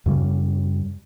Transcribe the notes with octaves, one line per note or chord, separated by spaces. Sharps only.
F#2 C#3 G3